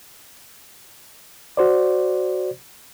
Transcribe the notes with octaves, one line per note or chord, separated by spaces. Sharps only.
F#4 C5 D5